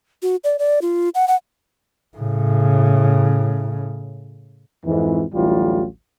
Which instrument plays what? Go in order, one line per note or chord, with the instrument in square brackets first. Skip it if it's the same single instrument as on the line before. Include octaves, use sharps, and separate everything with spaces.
[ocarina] F#4
D5
D5
F4
F#5
F#5
[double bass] A2 C#3
[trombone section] F2 G#2 E3
A1 D2 E3 F#3 G3 F4